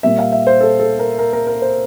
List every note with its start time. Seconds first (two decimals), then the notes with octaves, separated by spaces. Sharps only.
0.03 A#2 G3 E5
0.18 F5
0.32 E5
0.47 C5
0.61 A4
0.80 A4
0.99 A#4
1.19 A#4
1.33 A#4
1.47 A#4
1.62 C5